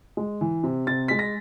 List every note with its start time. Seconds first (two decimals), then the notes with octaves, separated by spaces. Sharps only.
0.17 G#3
0.41 E3
0.64 C3
0.87 C3 A6
1.08 G#3 B6
1.19 A#6